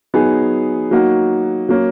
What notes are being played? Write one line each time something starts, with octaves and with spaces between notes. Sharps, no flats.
F#3 B3 D#4 G#4
F#3 A#3 D#4 F#4
F#3 A#3 C#4